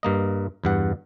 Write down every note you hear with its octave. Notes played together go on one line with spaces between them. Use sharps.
G2 A#3 D#5
E2 G2 F#5